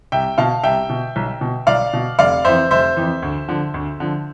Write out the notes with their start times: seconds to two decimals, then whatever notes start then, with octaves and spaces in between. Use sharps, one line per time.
0.12 C2 E5 G5
0.38 B2 F5 A5
0.64 C2 E5 G5
0.89 B2
1.16 B1
1.41 B2
1.67 B1 D5 F5
1.93 B2
2.19 F1 D5 F5
2.45 F2 E3 C5 E5
2.71 F1 C5 E5
2.97 F2 E3
3.22 D2
3.49 D3 F3
3.74 D2
4.00 D3 F3